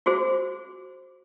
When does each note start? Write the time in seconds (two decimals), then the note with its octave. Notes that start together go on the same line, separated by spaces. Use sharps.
0.06 F4 F#4 G#4 C5